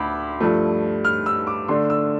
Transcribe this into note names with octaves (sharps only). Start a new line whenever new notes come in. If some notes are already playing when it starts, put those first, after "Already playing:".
Already playing: D2 B5 D6
G2 F3 A3
F6
E6
D6
D3 A3 D4 C6
E6